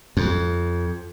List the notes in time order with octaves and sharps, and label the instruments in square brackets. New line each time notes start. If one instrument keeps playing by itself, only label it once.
[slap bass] F2